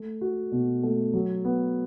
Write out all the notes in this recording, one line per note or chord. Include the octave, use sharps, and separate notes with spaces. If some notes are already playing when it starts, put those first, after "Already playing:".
Already playing: A3
F#4
B2
A3
F#3
B3